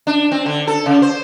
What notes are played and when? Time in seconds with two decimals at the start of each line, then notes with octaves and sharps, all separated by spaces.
0.07 D4
0.32 C4
0.46 D3
0.67 A4
0.86 C#3
1.02 C5